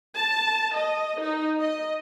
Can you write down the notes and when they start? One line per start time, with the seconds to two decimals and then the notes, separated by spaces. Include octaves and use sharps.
0.15 A5
0.77 D#5
1.20 D#4
1.59 D#5